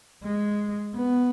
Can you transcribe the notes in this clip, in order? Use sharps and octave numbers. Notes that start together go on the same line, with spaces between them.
G#3
B3